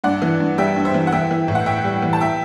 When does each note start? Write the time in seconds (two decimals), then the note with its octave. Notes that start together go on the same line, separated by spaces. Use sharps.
0.04 G2 D5 F#5
0.22 E3
0.40 G2
0.58 G3 E5 G5
0.76 G2
0.85 C5 E5
0.94 E3
1.07 F#5
1.12 E3 E5 G5
1.31 E3
1.48 A2
1.55 F#5
1.66 A2 E5 G5
1.84 G3
2.02 E3
2.13 A5
2.20 E5 G5